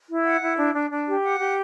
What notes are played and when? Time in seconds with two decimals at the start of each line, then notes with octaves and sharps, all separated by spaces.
0.08 E4
0.25 F#5
0.41 E4
0.58 D4
0.74 D4
0.91 D4
1.07 G4
1.24 F#5
1.40 G4